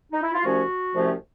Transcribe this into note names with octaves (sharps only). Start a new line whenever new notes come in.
D#4
E4
F4
C2 C3 F3 A3 C#4 F#4
C2 C3 F3 A3 C#4